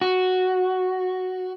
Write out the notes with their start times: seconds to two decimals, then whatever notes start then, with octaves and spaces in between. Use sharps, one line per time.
0.01 F#4